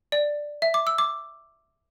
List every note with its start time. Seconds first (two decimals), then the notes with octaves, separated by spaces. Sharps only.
0.12 D5
0.62 E5
0.74 D6
0.87 E6
0.98 D6